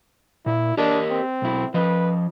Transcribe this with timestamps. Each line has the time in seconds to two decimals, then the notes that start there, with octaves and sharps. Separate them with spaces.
0.46 A#2 E4
0.77 D4 G4 A#4 D#5
1.10 C4
1.42 B1 E4
1.74 F3 B4 D#5